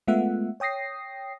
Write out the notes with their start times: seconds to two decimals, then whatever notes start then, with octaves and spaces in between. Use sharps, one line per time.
0.08 G#3 A3 B3 F4 E5 F#5
0.60 C#5 G5 D#6 A#6 C7